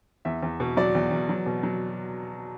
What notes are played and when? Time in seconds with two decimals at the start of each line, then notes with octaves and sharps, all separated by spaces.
0.25 E2 E5
0.43 E2
0.60 B2
0.77 F#3 D5
0.95 E2
1.11 E2
1.29 F#3
1.46 B2
1.63 F#3